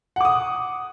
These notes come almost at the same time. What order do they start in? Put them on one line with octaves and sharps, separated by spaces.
F#5 D6 D#6